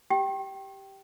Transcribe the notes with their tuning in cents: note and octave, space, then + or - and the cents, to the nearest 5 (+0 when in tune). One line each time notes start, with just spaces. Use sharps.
G4 +0 G5 -10